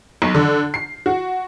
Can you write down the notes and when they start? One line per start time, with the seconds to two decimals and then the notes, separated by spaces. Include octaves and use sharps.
0.22 B1
0.35 D3
0.74 C7
1.06 F#4